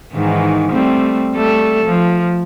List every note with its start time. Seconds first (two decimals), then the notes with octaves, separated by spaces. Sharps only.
0.13 G#2 D#3 E3
0.72 G3 A3 C4
1.35 G3 A3 A4
1.86 F3